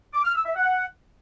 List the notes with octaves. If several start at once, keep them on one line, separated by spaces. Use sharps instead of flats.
D6
F6
E6
E5
F#5